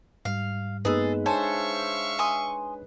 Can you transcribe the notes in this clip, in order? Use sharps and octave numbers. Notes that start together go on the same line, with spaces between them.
G#2 G3 F5
G2 G#3 A#3 B3 D#4 G#4 A4 B4
D4 A4 C5 C#5 E5 F5 G#5 C#6
G#5 C6 D#6